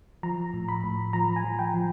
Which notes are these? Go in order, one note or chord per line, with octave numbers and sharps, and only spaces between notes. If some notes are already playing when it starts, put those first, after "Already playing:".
F3 A#5
A2
B5
A2
F3 A#5
G#5
F3
G5
F3